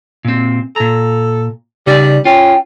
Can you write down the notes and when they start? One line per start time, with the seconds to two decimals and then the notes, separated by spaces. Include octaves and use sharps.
0.25 A#2 C4
0.76 A#2 A4 A#5
1.87 C#3 G3 D#4 D5
2.25 C#4 F4 G5